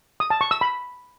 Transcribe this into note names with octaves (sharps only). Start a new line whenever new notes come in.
D#6
A5
C#6
E6
B5